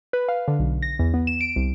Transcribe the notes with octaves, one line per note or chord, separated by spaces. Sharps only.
B4
F5
D3
B1
A#6
E2
B3
E7
D7
C2